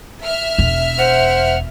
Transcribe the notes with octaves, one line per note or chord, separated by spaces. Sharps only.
E5 F6
E1
C5 F#5